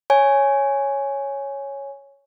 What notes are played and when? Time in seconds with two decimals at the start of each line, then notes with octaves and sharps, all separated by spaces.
0.10 C#5 G#5